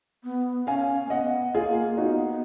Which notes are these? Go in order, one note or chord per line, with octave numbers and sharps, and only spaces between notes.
B3
C#4 F5 G#5
A#3
B3 D#5 F#5
A#3 F4 G#4
B3 D#4 F#4
B3